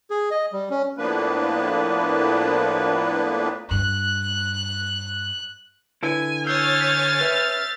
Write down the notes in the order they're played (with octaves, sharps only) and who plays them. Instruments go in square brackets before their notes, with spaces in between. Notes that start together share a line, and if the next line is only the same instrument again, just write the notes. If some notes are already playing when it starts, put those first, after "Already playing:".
[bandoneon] G#4
D#5
G3
C#4
[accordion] A2 F3 A#3 B3 D4 B4
[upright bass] G2 [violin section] F#6
[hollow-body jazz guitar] D3 E4 B4 [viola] G#5
[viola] C#5 G#5 [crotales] E6 G6 C7 [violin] F6 A6
[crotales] B6 F7
[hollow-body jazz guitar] B4 E5